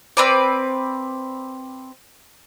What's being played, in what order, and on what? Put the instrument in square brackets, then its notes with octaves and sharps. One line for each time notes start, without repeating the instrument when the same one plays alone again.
[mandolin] C4 B4 D5